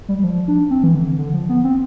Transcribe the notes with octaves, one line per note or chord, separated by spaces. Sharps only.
G3
G3
F3
D4
C4
E3
D3
D3
F3
B3
C4